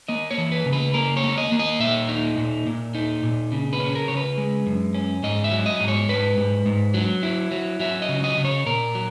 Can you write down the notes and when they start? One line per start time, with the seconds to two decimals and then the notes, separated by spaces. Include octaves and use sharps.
0.08 A#3 D#5
0.31 C#5
0.38 E3
0.52 B4
0.66 C#3
0.73 B4
0.94 A#3 A#4
1.17 C#5
1.24 A#3
1.38 D#5
1.52 A#3
1.59 D#5
1.80 A#2 E5
2.09 D#4
2.37 A#2
2.67 A#2
2.95 D#4
3.23 A#2
3.52 C#3
3.73 B4
3.80 C#4
3.95 A#4
4.08 C#3 C#5
4.17 B4
4.38 G#3
4.67 F#2
4.94 C#4
5.23 G#2 D#5
5.44 E5
5.51 F#3
5.66 D#5
5.80 G#2
5.88 C#5
6.09 G#2 B4
6.37 G#2
6.66 G#2
6.94 F#3
7.23 E4
7.51 F#3
7.80 F#3 E5
8.02 D#5
8.09 C#3
8.24 D#5
8.37 C#3
8.45 C#5
8.66 A#2 A#4
8.95 F#3